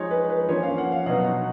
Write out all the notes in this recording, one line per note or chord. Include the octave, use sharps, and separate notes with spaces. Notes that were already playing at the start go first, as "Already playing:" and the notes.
Already playing: F3 G#3 D#4 C#5
B4
B4
F3 A#3 C#4 C#5
F5
F#5
F5
B2 F#3 B3 D#4 F#5
F#5